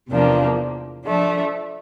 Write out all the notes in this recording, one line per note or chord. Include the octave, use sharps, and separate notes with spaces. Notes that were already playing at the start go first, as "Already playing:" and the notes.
E2 C3 F3 A#3 D4
F3 A3 D4